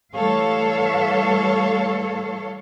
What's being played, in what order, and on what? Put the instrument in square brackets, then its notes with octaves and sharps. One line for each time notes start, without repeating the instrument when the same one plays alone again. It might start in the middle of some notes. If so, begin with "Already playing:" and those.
[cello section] E3 G3 A3 A4 C#5 F5